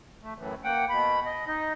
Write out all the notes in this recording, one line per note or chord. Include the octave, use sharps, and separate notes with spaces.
A3
F#2 A2 E3
A#3 F#5 G5
B2 B5
D#5
D#4 D#5